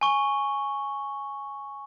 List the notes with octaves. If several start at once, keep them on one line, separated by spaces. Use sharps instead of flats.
G#5 C#6 G7